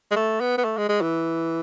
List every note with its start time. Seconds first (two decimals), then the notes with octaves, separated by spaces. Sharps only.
0.11 G#3
0.16 A3
0.40 B3
0.58 B3
0.64 A3
0.77 G#3
0.89 G#3
1.01 E3